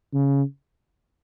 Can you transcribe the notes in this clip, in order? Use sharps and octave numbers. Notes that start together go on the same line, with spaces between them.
C#3